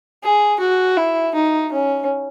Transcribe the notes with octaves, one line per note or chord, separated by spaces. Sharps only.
G#4
F#4
E4
D#4
C#4